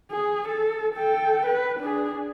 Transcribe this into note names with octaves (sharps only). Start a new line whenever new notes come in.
G#4
A4
A4 G5
B4
D4 G#4